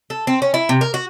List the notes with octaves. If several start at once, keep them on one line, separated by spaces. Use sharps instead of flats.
A4
C4
C#4
E4
C3
A#4
F#4